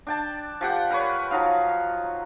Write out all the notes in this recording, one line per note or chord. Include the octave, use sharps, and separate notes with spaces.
D4 G5 A5
F3 G4 F#5 G5
A#4 B4 C#5
F3 F#3 D#4 F5